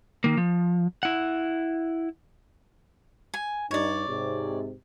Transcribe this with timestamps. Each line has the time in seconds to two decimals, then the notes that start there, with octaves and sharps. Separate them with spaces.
0.24 D#3 A#3
0.37 F3
1.03 E4 F#5
3.34 G#5
3.71 G2 D#4 C#5 D5
4.08 G#2 C3